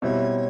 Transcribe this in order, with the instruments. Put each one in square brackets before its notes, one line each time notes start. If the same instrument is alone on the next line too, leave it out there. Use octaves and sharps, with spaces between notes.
[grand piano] B2 G3 C4 E4 [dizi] C#5